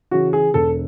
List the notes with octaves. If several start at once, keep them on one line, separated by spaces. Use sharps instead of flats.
C#3 E3 F#4
G#4
E1 A4